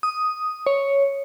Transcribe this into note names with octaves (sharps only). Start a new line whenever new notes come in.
D#6
C#5